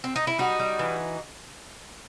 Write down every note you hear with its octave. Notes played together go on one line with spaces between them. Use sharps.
C4
D#4
E4
G3 D#4 F#4
G3
E3